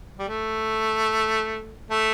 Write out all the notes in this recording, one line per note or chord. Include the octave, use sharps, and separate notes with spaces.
G3
A3
A3